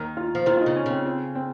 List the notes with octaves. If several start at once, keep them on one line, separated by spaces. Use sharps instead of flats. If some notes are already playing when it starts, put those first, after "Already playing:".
Already playing: D#2 D#3
F4
F3
D#2 D#3 F4
F4
D#4
C#3
C#4
C#3 C4
C4
C4